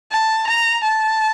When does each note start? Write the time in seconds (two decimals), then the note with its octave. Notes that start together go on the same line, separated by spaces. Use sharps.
0.11 A5
0.48 A#5
0.84 A5